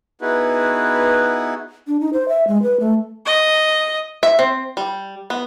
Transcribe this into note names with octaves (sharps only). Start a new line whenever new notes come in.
B3 D#4 E4 F#4 G#4 B4
D4
D#4
C5
E5
G#3
B4
A3
D#5
E5
C4
G3
B3